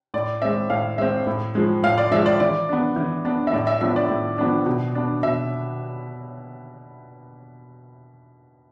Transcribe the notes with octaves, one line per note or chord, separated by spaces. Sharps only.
A2 D5
G#3 C4 E5
A2 F5
G#3 C4 E5
A2
F3 G#3
A2 F5
D5
F3 G#3 E5
D5
E3 D5
B3 D4
E3
B3 D4
E5
A2 D5
E5
F3 B3 D4 E5
D5
A2
F3 B3 D4
B2
B3 D4
B2 E5